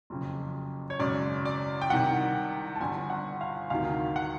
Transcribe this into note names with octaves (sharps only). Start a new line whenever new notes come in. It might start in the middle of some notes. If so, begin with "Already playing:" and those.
F#1 F2 C#3
C#5
G#1 F#2 C#3 D5
D5
G5
C2 C3 D#3 F#5
G5
A5
G1 G2 D3 G#5
F#5
F5
D2 C3 D#3 F5
F#5